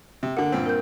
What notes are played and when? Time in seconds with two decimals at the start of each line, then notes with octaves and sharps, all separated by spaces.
0.23 C3
0.37 D3 A#3 F#5
0.52 G2 A#2 C4
0.66 A#4 G6